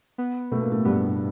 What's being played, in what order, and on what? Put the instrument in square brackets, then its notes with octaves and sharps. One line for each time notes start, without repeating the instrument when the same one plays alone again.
[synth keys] B3
[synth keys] B2 [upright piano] A3
[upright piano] A#3
A2 A3
[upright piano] G2 G3 [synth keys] B3